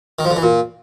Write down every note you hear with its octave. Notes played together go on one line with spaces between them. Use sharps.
D#3
F3
D3
E3
A#2